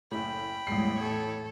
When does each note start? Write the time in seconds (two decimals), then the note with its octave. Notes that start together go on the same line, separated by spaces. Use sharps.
0.11 F#1 A2 G5 B5
0.67 A1 E2 A2 G3 G#3 C7
0.98 A4 C#5